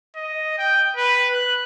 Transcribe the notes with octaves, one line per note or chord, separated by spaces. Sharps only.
D#5
G5
B4
F#6